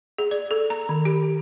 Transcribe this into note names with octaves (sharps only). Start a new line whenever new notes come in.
G#4
D5
A4
A#5
D#3
G4